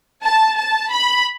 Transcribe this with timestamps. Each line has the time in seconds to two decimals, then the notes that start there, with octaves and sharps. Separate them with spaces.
0.23 A5
0.57 A5
0.91 B5